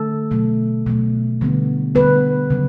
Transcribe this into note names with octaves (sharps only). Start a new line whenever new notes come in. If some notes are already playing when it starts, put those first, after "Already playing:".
Already playing: D3 A3 A4
B2 F#3 A3
B2 F#3 A3
D3 G3 B3
D3 G3 B3 B4
C#3 F#3